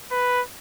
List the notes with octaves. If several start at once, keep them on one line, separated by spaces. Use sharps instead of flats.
B4